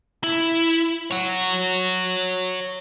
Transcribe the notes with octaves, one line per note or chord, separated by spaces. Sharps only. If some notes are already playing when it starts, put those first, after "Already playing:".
E4
C#5 F#5